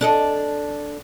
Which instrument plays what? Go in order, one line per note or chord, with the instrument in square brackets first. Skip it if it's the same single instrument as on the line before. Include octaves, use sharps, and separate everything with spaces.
[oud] D4 A4 D#5